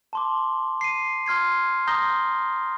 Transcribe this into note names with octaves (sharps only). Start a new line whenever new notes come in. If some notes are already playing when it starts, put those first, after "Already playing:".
A5 C6 D6
C7 D#7
C6 F6 G#6 C7
A#5 C6 D#6 G6 A#6 G7